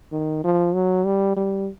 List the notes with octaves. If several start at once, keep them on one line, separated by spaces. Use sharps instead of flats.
D#3
F3
F#3
G3
G3